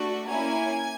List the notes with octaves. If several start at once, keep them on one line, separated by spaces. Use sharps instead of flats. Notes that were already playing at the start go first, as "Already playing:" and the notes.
Already playing: A3 D4 F#4
A#3 C#4 E4 G#5